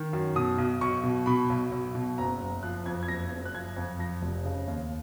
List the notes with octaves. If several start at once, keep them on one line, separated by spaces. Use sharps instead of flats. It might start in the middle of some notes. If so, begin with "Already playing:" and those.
Already playing: D#3
F#2
B2 D#6
B1
B1 C#6
B2
B2 B5
B1
B1
B2
F#1 A#5
F#1
F3 F#6
F2 G#6
G#6
F#1 A#6
F#1
F#6
F3 G#6
F2
F3 A#6
F1
C#3
D#2